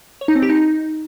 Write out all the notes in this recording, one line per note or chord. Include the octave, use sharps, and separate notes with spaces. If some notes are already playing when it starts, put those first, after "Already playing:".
C#5
D#4
C4
G4
D#4